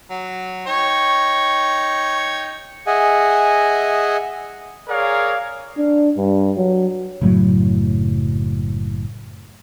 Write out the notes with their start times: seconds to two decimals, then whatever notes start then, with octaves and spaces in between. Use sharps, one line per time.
0.10 F#3
0.67 D#4 C#5 G5
2.87 G#4 D#5 E5 F#5 G#5
4.89 G#4 A#4 C#5 D5 F5
5.77 D4
6.17 G2
6.57 F#3
7.21 F#1 A2 F#3